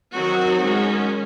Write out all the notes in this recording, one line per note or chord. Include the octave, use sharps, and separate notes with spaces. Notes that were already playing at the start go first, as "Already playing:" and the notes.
D#3 F#3 C4 F#4
D#3 G#3 C#4